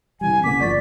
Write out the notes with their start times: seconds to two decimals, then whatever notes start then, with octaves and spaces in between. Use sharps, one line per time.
0.21 C3 E3 G3 G#5
0.44 D#1 C#3 A#3 F#5 D6 B6
0.60 G1 F3 D5 C#6 A6